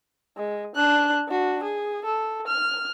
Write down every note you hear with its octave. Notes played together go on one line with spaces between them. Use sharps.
G#3
D4 F#6
D4 F#4
G#4
A4
F6